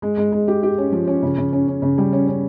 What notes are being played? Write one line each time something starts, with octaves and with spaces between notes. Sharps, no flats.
G#3
G#3
G#3
G4
G4
C#4
F3
C#4
C#3
C#3
C#4
C#4
C#3
G3
C#4
C#4